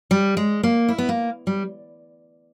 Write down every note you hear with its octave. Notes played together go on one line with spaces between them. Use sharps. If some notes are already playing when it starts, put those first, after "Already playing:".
G3
G#3
A#3
E4
B3
A#3
G3